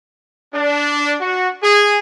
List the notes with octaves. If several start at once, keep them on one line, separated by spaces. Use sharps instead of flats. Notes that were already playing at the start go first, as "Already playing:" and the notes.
D4
F#4
G#4